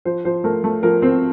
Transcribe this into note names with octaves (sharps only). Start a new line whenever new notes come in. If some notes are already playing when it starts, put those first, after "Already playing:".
F3 C5
F3 C5
A3 A#4
A3
F3 A#4
C4 C5